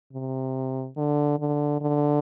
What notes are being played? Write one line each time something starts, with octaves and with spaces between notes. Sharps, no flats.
C3
D3
D3
D3